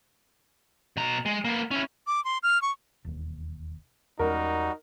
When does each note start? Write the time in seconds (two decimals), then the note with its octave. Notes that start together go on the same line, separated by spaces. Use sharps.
0.97 B2 A#5
1.26 G#3
1.45 A#3 B3
1.71 C#4 E4
2.07 D6
2.25 C6
2.43 F6
2.62 C#6
3.05 E1 D#2
4.19 E2 G3 G#3 C#4 D#4 F#4 A#4